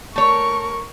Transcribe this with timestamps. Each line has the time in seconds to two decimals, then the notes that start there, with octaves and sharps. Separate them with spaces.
0.16 A3 A#4 C#5 C#6